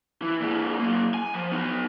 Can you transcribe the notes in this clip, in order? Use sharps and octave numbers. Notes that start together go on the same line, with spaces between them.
E3
A#2 G#3
F#3 A#3
G#5
F3
B3 D#4